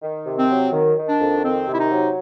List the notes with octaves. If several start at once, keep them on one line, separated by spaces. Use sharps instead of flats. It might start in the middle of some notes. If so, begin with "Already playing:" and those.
D#3
C3
C4
F#3
D#3
D#3
D4
F2
D#3 C4
C3
E4
D#4
F#3